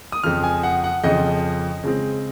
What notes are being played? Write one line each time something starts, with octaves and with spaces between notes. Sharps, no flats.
D#6
F2 C#3 F3 F6
G#5
F#5
F#5
F2 C#3 F3 D#5
C#3 G#3 C4